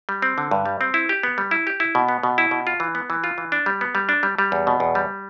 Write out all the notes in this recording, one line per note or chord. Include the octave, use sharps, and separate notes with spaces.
G3
C4
D3
G2
G3
C4
E4
G4
B3
G3
E4
G4
E4
B2
B3
B2
E4
B2
F4
E3
B3
E3
F4
E3
D4
G3
B3
G3
D4
G3
G3
E2
B2
E2
G3